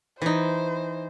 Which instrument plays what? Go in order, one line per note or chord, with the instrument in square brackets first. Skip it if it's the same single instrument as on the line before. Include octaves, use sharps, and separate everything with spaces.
[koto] E3 D#4 [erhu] C5